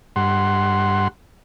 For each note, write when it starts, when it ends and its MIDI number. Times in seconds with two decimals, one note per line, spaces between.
0.16 1.08 43
0.16 1.08 78
0.16 1.08 84